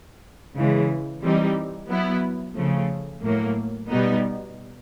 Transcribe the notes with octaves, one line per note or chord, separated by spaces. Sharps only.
C#3 E3 G#3
E3 G3 C4 D#4
F#3 B3 E4
C#3 F3 A3
A2 F#3 A#3
B2 G3 B3 D#4